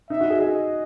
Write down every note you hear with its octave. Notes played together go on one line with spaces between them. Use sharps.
D#4 E5
F#4
G#4
G#4 D#5